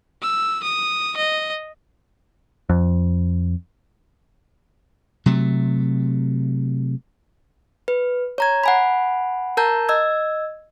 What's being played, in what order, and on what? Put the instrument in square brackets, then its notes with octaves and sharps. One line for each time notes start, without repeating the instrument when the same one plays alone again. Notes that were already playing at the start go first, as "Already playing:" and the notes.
[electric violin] E6
D#6
D#5
[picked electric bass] F2
[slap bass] C3 F#3 A3
[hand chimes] B4
C#5 A#5 G#6
F#5 G#5 B5
A#4 A5 A#5 G6
D#5 E6 G#6